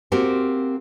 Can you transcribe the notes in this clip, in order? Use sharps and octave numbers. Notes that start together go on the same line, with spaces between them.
A#3 C4 F#4 G4 A#4 C5